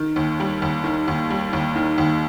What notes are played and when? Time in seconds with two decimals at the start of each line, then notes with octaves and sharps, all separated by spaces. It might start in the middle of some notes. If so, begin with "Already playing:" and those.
Already playing: D#3
0.16 D#2
0.40 G3
0.62 D#2
0.84 D#3
1.08 D#2
1.30 G3
1.53 D#2
1.76 D#3
1.98 D#2